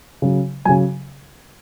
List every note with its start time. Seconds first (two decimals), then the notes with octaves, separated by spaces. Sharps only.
0.22 C#3 F#3
0.65 C#3 F#3 G#5